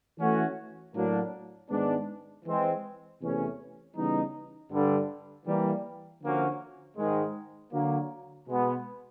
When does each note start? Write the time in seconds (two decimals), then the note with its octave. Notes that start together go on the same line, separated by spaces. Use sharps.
0.19 E3 A3 C#4 F#4
0.94 A2 F#3 A#3 D4
1.70 G#2 D#3 G#3 B3 D4
2.45 E3 G#3 C4
3.21 E2 C3 E3 A3 C#4
3.96 C#3 E3 G3 B3 D#4
4.71 G2 D3 G3
5.46 E3 G3 A#3
6.22 D3 F3 A#3 C#4 F#4
6.97 G#2 D#3 G#3
7.72 D3 F#3 A#3
8.48 B2 G#3 B3